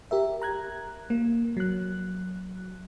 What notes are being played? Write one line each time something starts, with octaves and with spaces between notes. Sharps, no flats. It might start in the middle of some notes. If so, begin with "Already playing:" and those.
G4 A#4 E5
A#5 F#6 G#6
A#3
F#3 F#6